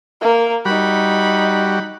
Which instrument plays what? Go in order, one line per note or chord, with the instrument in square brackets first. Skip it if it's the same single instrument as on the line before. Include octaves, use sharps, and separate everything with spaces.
[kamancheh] A#3 A#4
[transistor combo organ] G3 F#4 [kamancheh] D#4 B5